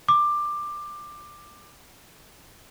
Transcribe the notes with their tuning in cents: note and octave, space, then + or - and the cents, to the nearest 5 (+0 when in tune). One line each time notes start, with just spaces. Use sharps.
D6 +15